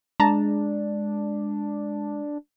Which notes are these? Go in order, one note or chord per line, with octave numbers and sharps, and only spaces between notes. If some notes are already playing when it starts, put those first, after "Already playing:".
G#3 D4 A5 A#5